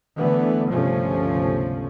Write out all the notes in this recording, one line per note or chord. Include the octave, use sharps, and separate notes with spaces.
D3 E3 A3 B3
G1 C#2 C3 F3 A3 C#4